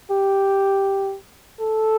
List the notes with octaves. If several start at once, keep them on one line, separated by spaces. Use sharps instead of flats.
G4
A4